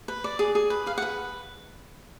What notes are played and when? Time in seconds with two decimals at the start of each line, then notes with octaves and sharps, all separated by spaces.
0.08 B4
0.24 D5
0.39 G#4
0.55 G#4
0.70 B4
0.86 G#4 F5
0.98 F#5
1.02 B4